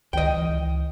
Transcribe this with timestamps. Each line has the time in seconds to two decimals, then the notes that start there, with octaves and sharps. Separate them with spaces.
0.13 C#2 D#3 D#5 G5
0.34 C#2 E3